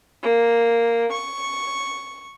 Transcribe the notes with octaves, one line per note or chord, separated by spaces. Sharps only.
A#3
C#6